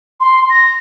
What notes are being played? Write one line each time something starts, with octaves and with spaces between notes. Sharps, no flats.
C6
A#6